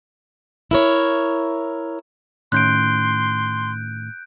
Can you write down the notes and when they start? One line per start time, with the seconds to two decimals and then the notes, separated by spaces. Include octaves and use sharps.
0.71 E4 A#4 C#5
2.52 A2 D#3 C#4 C6 F#6 G6 D7